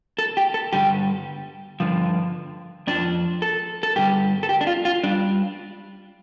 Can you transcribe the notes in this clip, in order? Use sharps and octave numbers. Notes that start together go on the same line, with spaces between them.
A4
G4
A4
G2 D3 G3 G4
G2 D3 F3
F2 F3 D4
A4
A4
G2 D3 G3 G4
A4
G4
D4
F4
F4
G3 D4